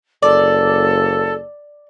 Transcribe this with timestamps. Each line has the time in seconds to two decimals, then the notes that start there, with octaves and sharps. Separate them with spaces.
0.22 F#1 A4 D5